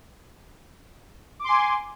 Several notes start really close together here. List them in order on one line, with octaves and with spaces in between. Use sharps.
D6 C6 G#5